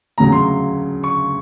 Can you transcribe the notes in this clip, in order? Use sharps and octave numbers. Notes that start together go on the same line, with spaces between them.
D2 C#3 F#3 A#5
C6
C#6